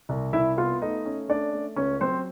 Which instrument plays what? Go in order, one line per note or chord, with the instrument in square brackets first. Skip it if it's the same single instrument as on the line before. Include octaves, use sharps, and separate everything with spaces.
[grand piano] C2
C2 E4 E5
B3 F4 F5
A3 D#4 D#5
C#4
A3 D4 D5
A3
C#2 C#4 C#5
F#3 C4 C5